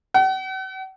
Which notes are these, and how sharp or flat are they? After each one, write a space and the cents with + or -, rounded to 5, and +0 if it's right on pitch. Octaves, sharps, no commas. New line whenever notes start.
F#5 +45